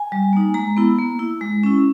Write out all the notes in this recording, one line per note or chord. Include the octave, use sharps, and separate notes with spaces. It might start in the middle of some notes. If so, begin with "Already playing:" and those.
Already playing: G#5
G3
A#3 D#4
G#3 A#5
B3 E4
A#3
E4
G#3
C#4 E4